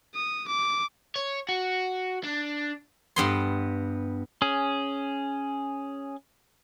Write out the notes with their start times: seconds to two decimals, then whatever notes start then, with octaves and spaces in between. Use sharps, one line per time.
0.15 D#6
0.47 D6
1.16 C#5
1.49 F#4
2.24 D4
3.16 G2 B3 C6
4.42 C#4 G#4